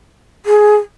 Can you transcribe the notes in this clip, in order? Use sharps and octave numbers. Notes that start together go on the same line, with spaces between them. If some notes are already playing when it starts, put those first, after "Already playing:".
G#4